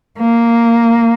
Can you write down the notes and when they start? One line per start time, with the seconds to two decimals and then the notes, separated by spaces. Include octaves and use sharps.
0.19 A#3